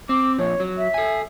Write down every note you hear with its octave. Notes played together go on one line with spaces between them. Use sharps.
C4 D6
A#2 F3 C#5
F#3
E5
A4 G#5